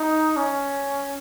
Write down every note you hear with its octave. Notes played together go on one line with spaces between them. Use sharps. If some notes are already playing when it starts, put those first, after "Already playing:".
Already playing: D#4
C#4